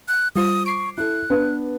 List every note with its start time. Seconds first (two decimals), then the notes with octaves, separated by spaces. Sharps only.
0.08 F#6
0.36 G3 F4 C5 D#6
0.66 C#6 D6 C7 D7
0.98 E4 A4 F#6
1.30 B3 D4 B4